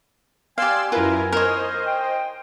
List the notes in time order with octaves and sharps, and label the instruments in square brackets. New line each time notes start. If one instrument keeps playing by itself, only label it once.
[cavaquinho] G4 F5 [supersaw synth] D5 C6 E6 [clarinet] G#5
[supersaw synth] F#2 E4 A#4 [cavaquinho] F4 B4
[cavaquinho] A#4 C#5 [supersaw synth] C5 D#5
[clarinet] G5